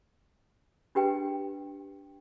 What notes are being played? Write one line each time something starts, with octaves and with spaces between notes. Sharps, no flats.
D4 G4 B4 G5